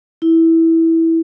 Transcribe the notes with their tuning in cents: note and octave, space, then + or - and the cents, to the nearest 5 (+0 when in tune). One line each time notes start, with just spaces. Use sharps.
E4 -10